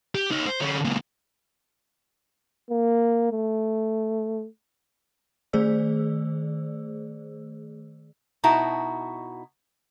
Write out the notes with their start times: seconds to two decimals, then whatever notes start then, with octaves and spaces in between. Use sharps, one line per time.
0.15 G4
0.31 D#4 C#5
0.46 C5
0.60 D3 C#4
0.84 C#2 A#2
2.70 A#3
3.32 A3
5.53 D#3 A3 G#4 C5 D5 E6
8.44 B2 D#4 E4 F#4 A5